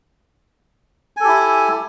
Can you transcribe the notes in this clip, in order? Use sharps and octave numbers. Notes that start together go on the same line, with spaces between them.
E4 G4 A4 G#5